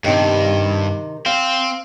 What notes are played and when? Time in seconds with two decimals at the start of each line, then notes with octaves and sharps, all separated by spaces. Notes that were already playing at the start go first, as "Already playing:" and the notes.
0.04 G2 C3 D#3
1.26 C4 F5